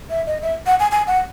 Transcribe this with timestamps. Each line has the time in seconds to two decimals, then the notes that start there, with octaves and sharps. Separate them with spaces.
0.10 E5
0.27 D#5
0.42 E5
0.67 F#5
0.80 G#5
0.92 G#5
1.07 F#5